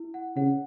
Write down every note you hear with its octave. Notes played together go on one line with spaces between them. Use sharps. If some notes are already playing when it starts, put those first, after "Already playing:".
Already playing: E4
F#5
C#3 F#5